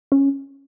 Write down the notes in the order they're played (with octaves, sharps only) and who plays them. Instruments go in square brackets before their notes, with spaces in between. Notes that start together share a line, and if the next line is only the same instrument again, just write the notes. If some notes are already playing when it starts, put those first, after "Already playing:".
[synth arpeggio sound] C#4